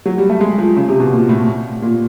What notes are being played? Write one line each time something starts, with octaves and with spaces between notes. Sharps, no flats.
F#3
G3
A3
G#3
F3
C#3
C3
B2
A#2
A2
A#2